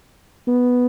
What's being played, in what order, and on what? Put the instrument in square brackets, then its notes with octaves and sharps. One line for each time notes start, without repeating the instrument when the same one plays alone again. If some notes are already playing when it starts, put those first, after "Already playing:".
[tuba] B3